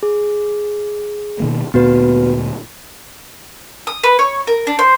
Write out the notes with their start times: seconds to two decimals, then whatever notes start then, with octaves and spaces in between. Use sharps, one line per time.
0.03 G#4
1.40 B2 D#3 A#3
1.74 D2 A#2 B3 F#4 B4
3.87 D#6
4.03 B4
4.19 C#5
4.47 A#4
4.67 D4
4.79 C5